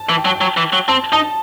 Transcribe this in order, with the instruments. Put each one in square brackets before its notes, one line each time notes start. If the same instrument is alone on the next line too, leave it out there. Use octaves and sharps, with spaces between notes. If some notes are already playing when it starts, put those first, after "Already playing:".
Already playing: [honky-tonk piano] A5
[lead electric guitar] E3
[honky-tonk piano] G5
[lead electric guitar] F#3 [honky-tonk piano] A5
[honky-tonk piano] G5
[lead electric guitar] F#3
E3
F#3
[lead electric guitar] C4 [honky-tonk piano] A5
[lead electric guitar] D#4 [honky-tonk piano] A5